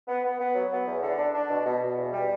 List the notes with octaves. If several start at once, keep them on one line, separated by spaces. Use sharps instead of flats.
B3
B3
B3
F#3
B3
E2
D3
D4
D4
B2
B2
B2
E2
G3